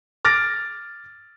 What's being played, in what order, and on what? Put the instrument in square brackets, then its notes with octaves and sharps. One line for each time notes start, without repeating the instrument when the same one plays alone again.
[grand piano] D6 F6 A6 A#6 D7